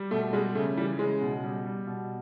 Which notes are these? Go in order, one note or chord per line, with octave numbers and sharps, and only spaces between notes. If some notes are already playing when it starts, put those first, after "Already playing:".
Already playing: G3
B2 A3
G3 G#3
C#3 A3
E3 G3
C#3 G#3
B2
G3
G3
B2